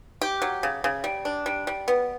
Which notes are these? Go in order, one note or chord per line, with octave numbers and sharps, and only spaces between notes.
G4
F#3
C#3
C#3
G3
D4
G3
G3
B3